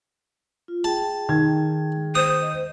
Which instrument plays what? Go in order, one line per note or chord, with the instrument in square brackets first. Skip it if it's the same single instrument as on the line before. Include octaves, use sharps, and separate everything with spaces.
[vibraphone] F4
[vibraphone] G#4 G5 [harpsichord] A5
[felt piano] D#3 G#6
[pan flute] C5 [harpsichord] D#6
[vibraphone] D#5